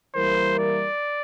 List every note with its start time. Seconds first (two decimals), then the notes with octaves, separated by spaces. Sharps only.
0.14 E3 G3 A#3 E4 A#4 C5
0.59 D5